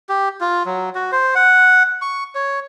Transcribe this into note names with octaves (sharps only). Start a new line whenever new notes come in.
G4
F4
F#3
F#4
C5
F#5
C#6
C#5